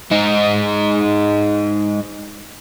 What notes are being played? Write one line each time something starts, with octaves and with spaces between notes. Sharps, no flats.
G#3 D#4